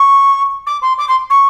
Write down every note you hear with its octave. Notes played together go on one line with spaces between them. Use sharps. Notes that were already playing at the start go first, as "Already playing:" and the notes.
Already playing: C#6
D6
C6
D6
C6
C#6